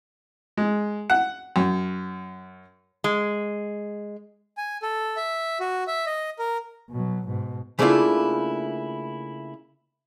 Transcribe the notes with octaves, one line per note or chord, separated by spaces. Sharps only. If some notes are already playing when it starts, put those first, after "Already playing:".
G#3
F#5
F#2
G#3
G#5
A4
E5
F#4
E5
D#5
A#4
B2 F#3
G#2 B2
C#3 A3 A#3 D4 E4 F4